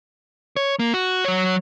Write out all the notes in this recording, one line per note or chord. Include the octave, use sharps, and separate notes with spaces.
C#5
A#3
F#4
F#3 C#5